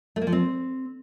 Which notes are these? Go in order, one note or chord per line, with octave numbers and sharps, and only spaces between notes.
A3
A#3
F3
C4